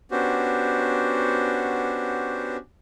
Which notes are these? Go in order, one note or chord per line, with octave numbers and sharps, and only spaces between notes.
B3 C#4 D4 F#4 G4 C5